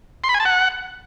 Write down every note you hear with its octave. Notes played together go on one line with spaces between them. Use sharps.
C6
B5
G#5
A5
F#5